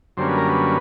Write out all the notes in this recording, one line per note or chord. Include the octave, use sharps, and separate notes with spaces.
F#2 D3 G3 A#3 C#4 C5
B4
A#4
B4